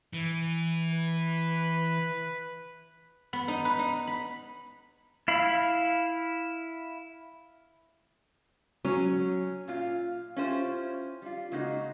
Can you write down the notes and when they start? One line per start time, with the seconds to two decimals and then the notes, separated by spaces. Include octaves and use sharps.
0.13 E3
0.91 B4
3.33 B3
3.48 D#4
3.65 B4
3.79 D#4
4.07 B5
5.28 E4 F5 B5
8.85 F#3 C#4
9.68 A#2 F4 F5
10.36 C#4 E4 F4 G4 C5
11.22 G3 F4
11.52 C#3 G#3 A#3 D#4 F#4